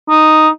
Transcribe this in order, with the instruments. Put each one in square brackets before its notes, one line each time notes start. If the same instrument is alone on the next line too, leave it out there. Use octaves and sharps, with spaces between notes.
[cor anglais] D#4